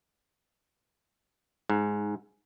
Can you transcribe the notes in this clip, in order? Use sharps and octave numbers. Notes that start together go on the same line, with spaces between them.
G#2